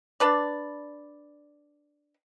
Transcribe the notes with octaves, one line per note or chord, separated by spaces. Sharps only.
D4 B4 D5